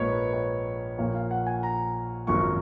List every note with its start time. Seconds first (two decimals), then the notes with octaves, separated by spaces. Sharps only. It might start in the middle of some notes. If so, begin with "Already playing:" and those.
Already playing: A#1 G#2 F3 A#3 B4 C#5
0.12 B4
0.33 C#5
0.98 A#1 A#2 F3 A#3 C#5
1.15 F5
1.31 F#5
1.47 G#5
1.63 A#5
2.27 G#1 F#2 F3 A#3 C#6